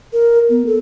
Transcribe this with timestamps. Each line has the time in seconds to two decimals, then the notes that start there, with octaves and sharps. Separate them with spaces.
0.13 A#4
0.50 B3
0.67 A4